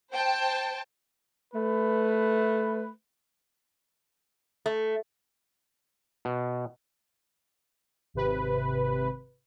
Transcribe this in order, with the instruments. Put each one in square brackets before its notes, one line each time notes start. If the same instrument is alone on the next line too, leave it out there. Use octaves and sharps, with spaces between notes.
[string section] C5 G5 A5
[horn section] A3 B4
[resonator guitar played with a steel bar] A3
[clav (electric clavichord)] B2
[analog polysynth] G#1 C3 B4